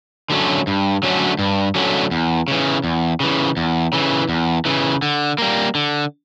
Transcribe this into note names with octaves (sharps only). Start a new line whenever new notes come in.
D3 F#3 A3 C#4
G2
D3 F#3 A3 C#4
G2
D3 F#3 A3 C#4
E2
C#3 E3
E2
C#3 E3
E2
C#3 E3
E2
C#3 E3
D3
G3 A#3
D3